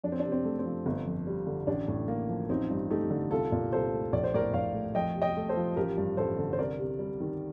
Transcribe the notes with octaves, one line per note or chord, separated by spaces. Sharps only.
F2 D4
C4
D4
C3
C4
A3
C4
F3
G1
F2
G3
D3
A1 D4
A2
A#3
F3
A1 C4 D#4
G2
A3 D#4 G4
D3
C2 F4 A4
A#2
C2 A4 C5
A3
A#1 D5
C5
A2 A#4 D5
A#1 D5 F5
A3
F2 D#5 G5
C3
D#5 G5
A3
A4 C5
F3
A1 G4 A#4
G2
A1 A4 C5
D3
C5
C2 A#4 D5
C3
G3
D#3